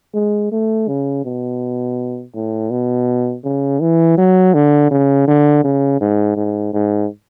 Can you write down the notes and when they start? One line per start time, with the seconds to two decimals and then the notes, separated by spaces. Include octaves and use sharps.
0.14 G#3
0.52 A3
0.88 C#3
1.25 B2
2.35 A2
2.71 B2
3.44 C#3
3.81 E3
4.18 F#3
4.54 D3
4.91 C#3
5.28 D3
5.64 C#3
6.01 G#2
6.37 G#2
6.74 G#2